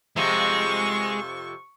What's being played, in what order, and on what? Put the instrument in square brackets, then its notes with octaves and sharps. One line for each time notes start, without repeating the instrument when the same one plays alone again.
[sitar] F2 C3 F3 [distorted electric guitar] G#3 [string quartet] C#6